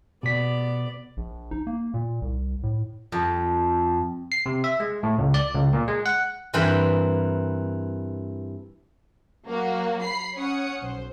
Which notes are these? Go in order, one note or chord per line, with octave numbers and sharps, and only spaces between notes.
B2 B3 D5 B6
A#1
D#4
A#3
A#2
C2
A2
F2
C7
C3
E5
G#3
A2
C#2
D5
C#2
A#2
G#3
F#5
G2 E3 C4 A#4 G5 B5
F#3 A#3 F#4
B5 C7
C#4 C#5 F#5 D#6 C#7
B1 C5